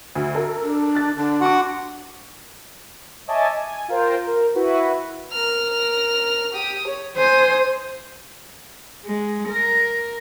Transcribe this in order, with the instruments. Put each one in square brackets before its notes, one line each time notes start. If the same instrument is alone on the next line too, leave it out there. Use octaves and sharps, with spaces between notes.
[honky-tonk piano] D2
A4 A#4
[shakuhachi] D4
[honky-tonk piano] F#6 A6
[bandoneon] D3 [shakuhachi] D4
[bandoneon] F#4 F#5 [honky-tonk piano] C6 D6
[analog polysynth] C#5 D#5 E5 G#5 A5 D6
G#5
F4 A#4 C5 G5
A#4
E4 F#4 B4
[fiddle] A#4 F6
G4 D#6
C#5
[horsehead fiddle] C5 [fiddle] G#5 D#6
[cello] G#3
A#4